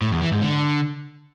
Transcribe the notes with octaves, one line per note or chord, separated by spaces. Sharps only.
A2
E2
E3
G#2
D3